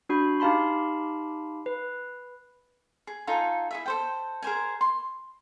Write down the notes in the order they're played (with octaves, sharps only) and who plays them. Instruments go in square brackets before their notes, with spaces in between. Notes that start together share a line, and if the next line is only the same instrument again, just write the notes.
[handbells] D4 F#4 B5
D#4 G4 F5 A5 B5 C6
B4
[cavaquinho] G#4
D#4 F4 A4 G#5
E4 G#4 E5
A4 C5 G5
G#4 A#4 C5 G#5
C6